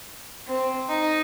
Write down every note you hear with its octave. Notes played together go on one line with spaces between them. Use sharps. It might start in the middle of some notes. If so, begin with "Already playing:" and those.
C4
D#4